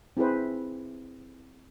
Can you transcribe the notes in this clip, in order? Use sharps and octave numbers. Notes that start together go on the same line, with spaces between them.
C4 E4 G#4 B4 C5